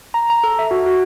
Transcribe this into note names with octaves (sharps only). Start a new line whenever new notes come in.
A#5
A#5
A4
E5
F#4
F#4